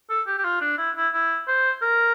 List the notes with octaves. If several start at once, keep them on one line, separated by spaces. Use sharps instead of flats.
A4
G4
G4
F4
D4
E4
E4
E4
C5
A#4